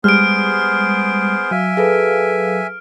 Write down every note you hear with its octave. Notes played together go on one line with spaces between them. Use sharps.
G3 G#3 B3 G#4 C5 F6 D7
F#3 E5 F5 G#5
G#4 A4 B4